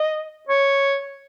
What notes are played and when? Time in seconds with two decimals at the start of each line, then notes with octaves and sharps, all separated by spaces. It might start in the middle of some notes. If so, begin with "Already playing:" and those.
Already playing: D#5
0.49 C#5